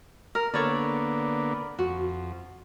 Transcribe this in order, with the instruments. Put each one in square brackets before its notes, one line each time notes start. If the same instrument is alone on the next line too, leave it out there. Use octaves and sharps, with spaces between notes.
[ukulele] A#4
[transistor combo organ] D3 A#3 B3 [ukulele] A4 C#5 D5
[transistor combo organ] F2 [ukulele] F#4